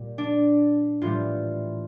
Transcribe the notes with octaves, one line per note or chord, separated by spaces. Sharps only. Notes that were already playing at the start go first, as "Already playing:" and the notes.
Already playing: A#2 G3
D4
A2 E3 G3 F4